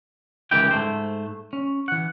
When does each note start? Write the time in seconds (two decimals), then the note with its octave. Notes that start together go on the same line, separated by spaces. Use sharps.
0.51 C#2 D#3 E3 G4 G5
0.71 G#2 A3 C5
1.53 C#4
1.88 E3 F#5